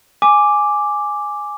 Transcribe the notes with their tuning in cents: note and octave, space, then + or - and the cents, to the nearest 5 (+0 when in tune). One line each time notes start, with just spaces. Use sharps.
G#5 +0 D6 +0